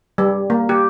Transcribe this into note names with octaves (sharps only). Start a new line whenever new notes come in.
G3
A#3
G4